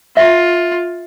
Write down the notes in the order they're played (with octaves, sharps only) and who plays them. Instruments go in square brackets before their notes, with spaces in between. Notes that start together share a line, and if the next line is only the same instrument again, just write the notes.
[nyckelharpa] F4 [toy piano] E5